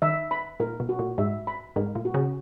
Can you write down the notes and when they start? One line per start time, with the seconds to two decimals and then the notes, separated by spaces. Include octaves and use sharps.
0.02 D#3 E5
0.31 B5
0.60 A#2 A#4
0.80 B2
0.89 F#4
0.99 A#2
1.18 G#2 E5
1.47 B5
1.76 G#2 A#4
1.95 A#2
2.05 F#4
2.14 C#3